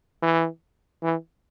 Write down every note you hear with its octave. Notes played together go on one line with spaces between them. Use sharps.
E3
E3